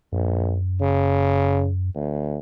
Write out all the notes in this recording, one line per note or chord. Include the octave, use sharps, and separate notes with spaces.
A#1 F#2
C#3
D2